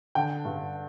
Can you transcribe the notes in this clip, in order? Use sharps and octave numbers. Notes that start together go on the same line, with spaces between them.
D3 G5
G2